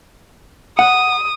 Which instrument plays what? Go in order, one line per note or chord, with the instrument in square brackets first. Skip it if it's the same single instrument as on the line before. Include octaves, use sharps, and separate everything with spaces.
[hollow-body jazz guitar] F#5 [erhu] D#6